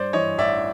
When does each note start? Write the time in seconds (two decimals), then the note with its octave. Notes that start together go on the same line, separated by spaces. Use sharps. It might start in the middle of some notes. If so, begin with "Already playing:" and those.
Already playing: G2 C5 D5
0.13 E3 C#5 D#5
0.38 A1 D5 E5